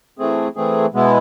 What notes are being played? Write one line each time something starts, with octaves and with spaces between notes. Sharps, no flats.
E3 A3 C4 G#4
E3 A3 C4 G#4
B2 G#3 B3 E4